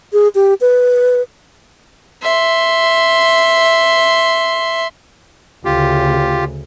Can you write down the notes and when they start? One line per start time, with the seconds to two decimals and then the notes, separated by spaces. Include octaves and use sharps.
0.13 G#4
0.35 G4
0.61 B4
2.22 E5 C6
5.65 D2 C#3 F4 G4